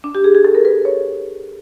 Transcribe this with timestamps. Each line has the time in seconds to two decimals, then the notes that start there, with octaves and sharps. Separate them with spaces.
0.04 D4
0.15 G4
0.24 G#4
0.35 G#4
0.45 A4
0.55 A#4
0.65 B4
0.85 C#5